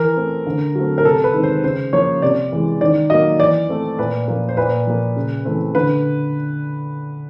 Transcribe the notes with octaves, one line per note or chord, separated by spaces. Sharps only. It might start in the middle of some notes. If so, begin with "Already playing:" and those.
Already playing: E3 A#4
A3 C4
D3
F#3 A3 C4
A#4
C3 A4
B4
D#3 G#3 C4
C5
C#3 C5
F3 A#3 C#5
C3 D5
E3 G#3
D#3 D5
F#3 A#3 D#5
E3 D5
A3 C4
A#2 B4
F3 A#3
C5
A#2 B4
F3 A#3
C#3
E3 A3 C4
D3 B4